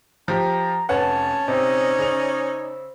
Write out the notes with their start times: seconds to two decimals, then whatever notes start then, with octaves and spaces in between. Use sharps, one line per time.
0.28 F3 G4 A#5
0.89 F1 C#4 B4 C#5 F#5 A5
1.48 C3 D#4 C5 D5 D#5 E6
1.99 C#3 F7